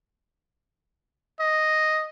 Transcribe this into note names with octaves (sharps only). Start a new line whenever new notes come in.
D#5